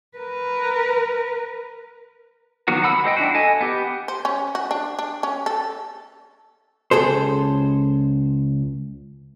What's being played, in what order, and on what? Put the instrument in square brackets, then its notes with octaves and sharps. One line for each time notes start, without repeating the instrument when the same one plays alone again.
[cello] A#4 B4
[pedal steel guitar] D#3 F#3 A#3 B3 F#4
F#5 B5 E6
G#3 C5 D#5 G5
D4 E4 F#4
A4 D#5 G#5
B3 G4
[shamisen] C5
C#4
F#4
D4
D4
C#4
A4
[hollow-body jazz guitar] C#2 G#4 A4 C5